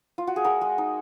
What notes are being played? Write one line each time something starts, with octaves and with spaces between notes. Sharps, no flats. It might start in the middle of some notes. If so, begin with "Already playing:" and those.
F4
F#4
G#4
G#3 F#4 A#4
G#3
D#4